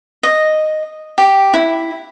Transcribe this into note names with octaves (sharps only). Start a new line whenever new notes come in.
D#5
G4
E4